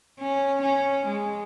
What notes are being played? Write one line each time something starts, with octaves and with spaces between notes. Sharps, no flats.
C#4
C#4
G#3